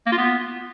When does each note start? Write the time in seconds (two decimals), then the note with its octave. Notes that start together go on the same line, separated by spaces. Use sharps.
0.06 A#3
0.12 F4
0.18 B3